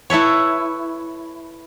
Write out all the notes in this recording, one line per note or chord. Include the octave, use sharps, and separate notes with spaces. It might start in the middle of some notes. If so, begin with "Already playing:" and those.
E4 A4 B4 C#5